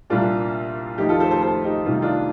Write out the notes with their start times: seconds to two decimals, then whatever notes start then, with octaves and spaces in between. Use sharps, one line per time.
0.10 C2 A#2 D4 F4
0.98 F2 D#3 D#4 G4
1.09 F4 A4
1.20 A4 C5
1.31 A4 C5
1.42 A4 C5
1.64 D#4 G4
1.85 C2 C3 D#3 F4
1.94 D#4
2.02 D4 F4